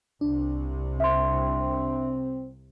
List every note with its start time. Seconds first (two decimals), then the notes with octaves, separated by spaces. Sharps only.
0.21 C2 C3 D4
1.00 C4 E5 C6